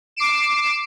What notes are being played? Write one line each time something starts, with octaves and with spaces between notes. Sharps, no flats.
D6 C7 D7 E7